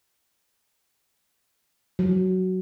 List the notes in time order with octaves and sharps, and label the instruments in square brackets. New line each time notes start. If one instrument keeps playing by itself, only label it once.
[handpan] F#3